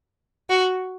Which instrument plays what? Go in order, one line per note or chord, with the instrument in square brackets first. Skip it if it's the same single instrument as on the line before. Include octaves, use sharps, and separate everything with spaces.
[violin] F#4